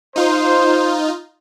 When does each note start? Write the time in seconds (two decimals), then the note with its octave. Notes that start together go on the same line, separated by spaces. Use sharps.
0.16 D#4 F4 C5